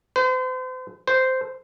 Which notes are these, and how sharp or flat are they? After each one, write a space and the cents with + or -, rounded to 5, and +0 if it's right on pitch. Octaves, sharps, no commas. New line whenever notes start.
C5 -40
C5 -10